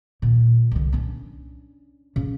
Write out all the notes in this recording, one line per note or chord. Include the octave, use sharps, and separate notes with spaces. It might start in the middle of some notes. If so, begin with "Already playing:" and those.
D#2 A#2
C2 D3
C#4 D4
C#3